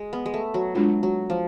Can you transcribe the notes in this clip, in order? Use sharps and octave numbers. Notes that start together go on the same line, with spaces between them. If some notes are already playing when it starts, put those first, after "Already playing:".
Already playing: G#3
B3
G#3
A3
F#3
F#3 G#3 D4 F4
F#3
F3